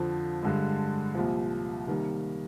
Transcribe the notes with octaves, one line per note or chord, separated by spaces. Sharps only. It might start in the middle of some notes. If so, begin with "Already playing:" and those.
Already playing: F2 D3 F3
G2 D3 G#3
C2 A#2 F3
C3 D#3 G3 A#3